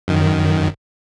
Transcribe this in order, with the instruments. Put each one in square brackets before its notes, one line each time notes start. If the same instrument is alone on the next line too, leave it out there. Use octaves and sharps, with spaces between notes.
[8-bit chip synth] F#2 D#3